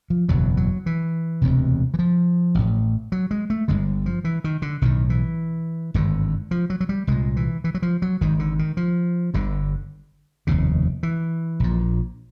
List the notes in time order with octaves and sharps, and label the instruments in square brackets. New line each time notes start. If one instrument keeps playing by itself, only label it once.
[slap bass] F3
F#1 E2 B2 F#3
F#3
E3
E1 D2 C3
E3
F3
A1 A2
F#3
G#3
A3
G1 G2 D3 G#3
F3
E3
D#3
D3
B1 A2 D#3
E3
G#1 G2 D3
F3
F#3
F#3
G3
C2 A#2 G#3
E3
E3
F#3
F3
F#3
G#1 G#2 D#3
D3
D#3
F3
G1 G2 D3
F1 D#2 C#3
E3
A#1 A#2